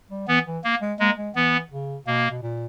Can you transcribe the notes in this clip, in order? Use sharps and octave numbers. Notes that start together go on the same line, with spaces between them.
G3
E3 B3
E3
A#3
G#3
G#3 A#3
G#3
E3 B3
C#3
B2 A#3
B2
A#2